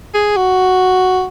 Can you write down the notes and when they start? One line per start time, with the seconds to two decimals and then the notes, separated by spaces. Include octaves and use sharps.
0.14 G#4
0.36 F#4